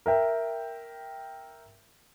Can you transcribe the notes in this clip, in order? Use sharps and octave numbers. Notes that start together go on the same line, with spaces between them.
A#4 E5 G5